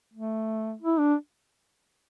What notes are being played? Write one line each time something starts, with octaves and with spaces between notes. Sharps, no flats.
A3
E4
D4